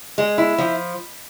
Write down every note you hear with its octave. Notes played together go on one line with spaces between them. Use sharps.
G#3
E4
F3